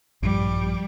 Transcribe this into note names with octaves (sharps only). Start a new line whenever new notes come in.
A#1 G2 F3 G3